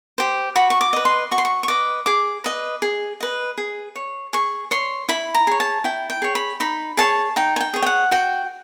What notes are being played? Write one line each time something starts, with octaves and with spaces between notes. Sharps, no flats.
G4 C5
F#4 B5
C#6
D6
B4 D#5
C6
F#4 C#6
C6
C#6
C#6
B4 D#5 D6
G#4 D6
B4 D#5
G#4
B4 D#5
G#4
C#5
G#4 C#6
C#5 C6
E4 B5
A#5
G#4 C#5
A5
E4 G5
G5
G#4 C#5
B5
D#4 B5
G#4 C#5 A5
D#4 G5
G#5
G5
G#4 C#5
G5
F#5
F#4 G5